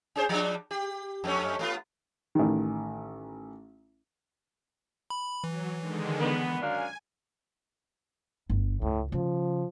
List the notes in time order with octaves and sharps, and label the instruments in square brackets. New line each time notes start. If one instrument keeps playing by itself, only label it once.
[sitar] C#4 G#4 C5
F3 G3 D4
G4
F2 A3 C#4
A3 B3 F4
[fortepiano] A1 D#3
[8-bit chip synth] B5
[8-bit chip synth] E3 [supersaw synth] F#3
[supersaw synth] D3 D#3 G#3
[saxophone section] B3
[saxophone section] F#2 D4 F5 [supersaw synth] G#5
[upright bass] G1
[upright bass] C#2 [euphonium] A2
[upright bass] C#3 [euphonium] F3